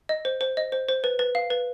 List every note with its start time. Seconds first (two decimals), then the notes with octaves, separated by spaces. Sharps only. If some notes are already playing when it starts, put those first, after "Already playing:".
0.09 D#5
0.25 C5
0.41 C5
0.57 D#5
0.72 C5
0.89 C5
1.04 B4
1.19 B4
1.35 F5
1.50 B4